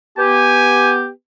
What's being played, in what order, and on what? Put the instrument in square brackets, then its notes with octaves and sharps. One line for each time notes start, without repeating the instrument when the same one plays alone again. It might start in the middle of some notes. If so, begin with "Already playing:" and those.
[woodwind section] B3 G4 [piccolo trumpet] G#5